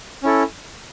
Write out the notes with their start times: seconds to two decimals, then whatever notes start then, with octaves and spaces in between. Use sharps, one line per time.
0.23 C#4 E4 A4